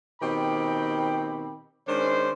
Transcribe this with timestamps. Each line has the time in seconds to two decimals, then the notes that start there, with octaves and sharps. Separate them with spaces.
0.22 B2 D#3 C4 G4 G5 B5
1.88 D#3 G#3 C#4 D4 C5